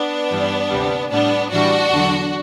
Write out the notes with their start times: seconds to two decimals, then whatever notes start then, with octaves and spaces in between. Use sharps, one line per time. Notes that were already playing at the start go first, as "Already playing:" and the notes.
Already playing: B3 D4
0.31 G2 E3 G3
0.70 D2 C3 E3 G3
1.10 A2 G3 B3 D4
1.50 A2 E3 G3 D4 F#4
1.91 E2 D3 F#3